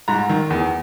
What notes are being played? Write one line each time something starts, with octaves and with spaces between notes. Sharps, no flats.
G#2 A#5
D#3
E2